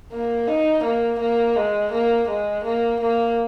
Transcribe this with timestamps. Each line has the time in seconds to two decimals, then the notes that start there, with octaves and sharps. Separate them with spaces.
0.12 A#3
0.48 D#4
0.84 A#3
1.20 A#3
1.56 G#3
1.92 A#3
2.29 G#3
2.65 A#3
3.01 A#3